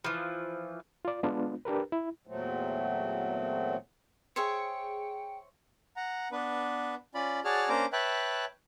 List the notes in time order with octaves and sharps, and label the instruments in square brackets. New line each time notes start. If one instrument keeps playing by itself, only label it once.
[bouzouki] E3 F3
[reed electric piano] F4 D5
G#3 B3 D4 F4
D4 G4 A#4 B4
E4
[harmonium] E2 A#2 F#3 A3 C4
[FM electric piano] G#4 C#7 [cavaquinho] C5 C#5 E5 [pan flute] G5
[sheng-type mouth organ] F#5 A#5
B3 D4 B4
C#4 F4 D5 B5
F#4 G#4 C#5 D5 A5 F6
A#3 C#4 D4 C5 A#5 D6
B4 C#5 E5 G5 A5 F#6